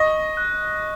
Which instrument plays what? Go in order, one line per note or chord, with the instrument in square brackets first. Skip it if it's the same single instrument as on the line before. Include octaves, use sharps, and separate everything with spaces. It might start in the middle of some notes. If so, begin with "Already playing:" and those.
Already playing: [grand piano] D#5 [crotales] C#6
[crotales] F#6